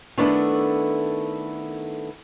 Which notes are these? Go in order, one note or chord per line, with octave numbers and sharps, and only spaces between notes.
D#3 A3 B3 D4 E4 A4